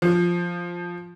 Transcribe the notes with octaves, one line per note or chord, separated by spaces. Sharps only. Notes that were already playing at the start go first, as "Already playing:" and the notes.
F3